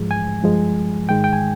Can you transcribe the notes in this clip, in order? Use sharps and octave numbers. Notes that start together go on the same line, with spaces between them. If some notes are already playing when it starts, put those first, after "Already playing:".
Already playing: G#2 F3 G#3
G#5
G2 F3 G#3
G#2 D#3 G#3 G5
G5
G#5